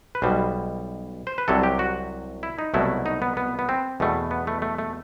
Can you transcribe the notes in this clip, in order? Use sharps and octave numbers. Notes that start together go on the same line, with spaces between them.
B4
B1 B2 G3 C5
C5
B4
C2 C3 F#3 A4
G4
F#4
E4
D#4
C2 B2 F#3 A3 E4
D#4
B3
B3
B3
C4
E2 B2 A3
B3
A3
A3
A3